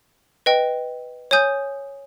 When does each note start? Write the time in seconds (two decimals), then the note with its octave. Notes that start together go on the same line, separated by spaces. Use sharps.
0.46 B4 D#5 G5
1.31 C#5 G#5 D#6 G6